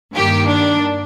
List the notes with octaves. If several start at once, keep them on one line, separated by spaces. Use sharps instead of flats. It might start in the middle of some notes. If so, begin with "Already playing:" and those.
G2 D#3 A#3 G4
D4